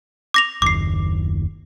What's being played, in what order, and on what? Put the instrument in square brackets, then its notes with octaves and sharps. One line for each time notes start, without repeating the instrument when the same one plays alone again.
[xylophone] D6 A#6 F7
[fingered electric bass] F#1 D#2 [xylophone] D6 C7